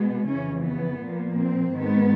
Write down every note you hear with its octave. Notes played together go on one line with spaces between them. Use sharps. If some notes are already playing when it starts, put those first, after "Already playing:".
Already playing: B2 G#3 B3
F2 C#3 E3 C#4
B3
A#2 F3 A#3
C4
G#2 D#3 G#3 B3